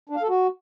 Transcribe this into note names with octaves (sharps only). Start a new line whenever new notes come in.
D4
F5
A4
F#4